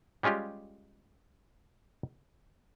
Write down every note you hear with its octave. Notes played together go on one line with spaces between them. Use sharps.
G3 G#3 C#4 F4 G4